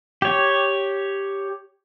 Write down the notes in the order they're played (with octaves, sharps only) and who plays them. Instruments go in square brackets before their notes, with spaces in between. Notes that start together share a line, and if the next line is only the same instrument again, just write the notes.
[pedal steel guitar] G4 C#5